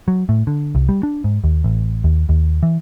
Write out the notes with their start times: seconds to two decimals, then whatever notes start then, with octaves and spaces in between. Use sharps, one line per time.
0.08 F#3
0.29 A2
0.47 D3
0.75 C2
0.89 G3
1.03 D4
1.24 G#2
1.44 D#2
1.64 A1
2.04 D#2
2.29 D#2
2.63 E3